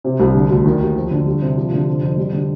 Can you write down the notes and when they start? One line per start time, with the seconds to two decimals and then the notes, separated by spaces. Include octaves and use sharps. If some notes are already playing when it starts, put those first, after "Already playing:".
0.04 C3
0.20 C2
0.35 D3
0.50 D2
0.66 D#3
0.81 D#2
0.95 F3
1.11 D3
1.26 G3
1.41 C3
1.57 F3
1.72 D3
1.88 C3
2.02 F2
2.17 G3
2.33 D3